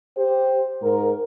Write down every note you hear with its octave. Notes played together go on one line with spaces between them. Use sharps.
G4 C5
G#2 A#4